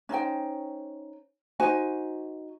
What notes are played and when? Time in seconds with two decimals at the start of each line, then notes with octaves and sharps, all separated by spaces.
0.09 C#4 D#4 C5 G5
1.60 D#4 F#4 C5 G#5